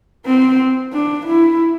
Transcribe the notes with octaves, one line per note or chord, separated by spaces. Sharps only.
C4
D4
E4